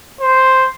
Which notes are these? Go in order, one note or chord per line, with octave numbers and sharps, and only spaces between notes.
C5